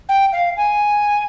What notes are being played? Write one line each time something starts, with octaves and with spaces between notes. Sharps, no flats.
G5
F5
G#5